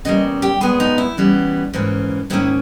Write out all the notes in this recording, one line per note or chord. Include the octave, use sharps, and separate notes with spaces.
E2 C#3 G3 A#3 D#5
G4
A#2 G#3 B3 G#4
D#4
E4
C#3 E3 G3 B3
G#2 E3 A#3 C#4
G#2 D#3 A#3 C#4 E4